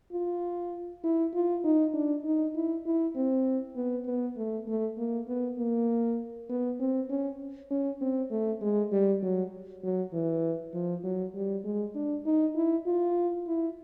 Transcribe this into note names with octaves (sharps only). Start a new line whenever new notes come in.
F4
E4
F4
D#4
D4
D#4
E4
E4
C4
B3
B3
A3
A3
A#3
B3
A#3
B3
C4
C#4
C#4
C4
A3
G#3
G3
F#3
F#3
E3
F3
F#3
G3
G#3
D4
D#4
E4
F4
E4